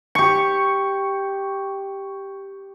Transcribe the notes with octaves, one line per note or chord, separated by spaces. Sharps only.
G4 C#6